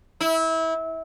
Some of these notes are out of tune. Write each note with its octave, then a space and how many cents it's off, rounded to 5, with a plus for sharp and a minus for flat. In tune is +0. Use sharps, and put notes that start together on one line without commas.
E4 -25